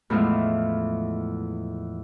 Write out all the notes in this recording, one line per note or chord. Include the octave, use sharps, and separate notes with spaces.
E2 A2 E3 F3 G#3